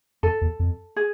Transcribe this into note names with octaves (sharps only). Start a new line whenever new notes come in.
F2 A4
E2
F2
G#4